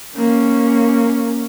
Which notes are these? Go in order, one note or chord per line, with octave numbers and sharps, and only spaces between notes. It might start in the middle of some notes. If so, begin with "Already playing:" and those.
A#3 C#4